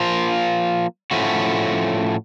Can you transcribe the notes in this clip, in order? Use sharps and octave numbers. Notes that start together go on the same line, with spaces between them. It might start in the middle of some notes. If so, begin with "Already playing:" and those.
Already playing: F3 A#3 F4
A2 F3 A3 C#4 F#4